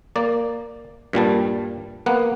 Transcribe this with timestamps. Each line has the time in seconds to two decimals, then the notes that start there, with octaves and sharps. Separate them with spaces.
0.16 A#3 D5
1.13 G2 A#2 G3 A5
2.06 A#3 B3 F#5